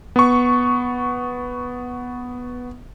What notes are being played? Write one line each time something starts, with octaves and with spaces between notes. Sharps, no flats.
B3 C#6